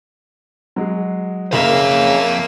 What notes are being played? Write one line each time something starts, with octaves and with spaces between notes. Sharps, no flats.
F#3 G#3
F#1 F2 C#3 A#3 A#4 E5 F5 A#6